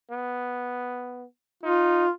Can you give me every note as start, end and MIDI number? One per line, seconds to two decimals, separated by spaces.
0.11 1.25 59
1.63 2.05 63
1.63 2.11 65